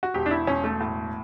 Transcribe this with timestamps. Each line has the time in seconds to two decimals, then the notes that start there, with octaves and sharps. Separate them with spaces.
0.03 F#4
0.14 E1 G4
0.26 D4
0.31 E4
0.47 E1 C#4
0.64 A3
0.81 A2